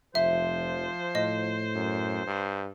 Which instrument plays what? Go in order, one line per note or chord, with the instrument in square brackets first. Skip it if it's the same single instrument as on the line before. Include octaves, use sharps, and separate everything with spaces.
[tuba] F1 [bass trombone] F3 [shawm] C5 [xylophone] E5
[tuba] A2 [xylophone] D#5
[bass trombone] F#2
G2